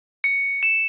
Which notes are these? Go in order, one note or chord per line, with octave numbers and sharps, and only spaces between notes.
C#7
E7